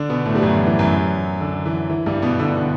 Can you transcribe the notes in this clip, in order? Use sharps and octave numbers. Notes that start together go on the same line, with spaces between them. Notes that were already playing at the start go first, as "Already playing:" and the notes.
Already playing: D3 D4
B2 B3
A2 A3
G3
F#2 F#3
E3
E3
F#2 F#3
D3
E3
E3
G2 G3
B2 B3
D3
D3